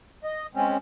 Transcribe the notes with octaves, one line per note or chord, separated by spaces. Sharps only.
D#5
G#3 C4 C#4